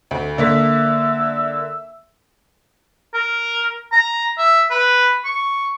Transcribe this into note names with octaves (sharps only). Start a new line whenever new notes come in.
D2
D3 A#3 E5 B6
A#4
A#5
E5
B4
C#6